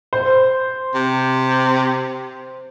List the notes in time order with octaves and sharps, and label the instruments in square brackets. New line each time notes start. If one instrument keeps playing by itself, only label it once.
[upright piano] C5
[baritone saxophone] C3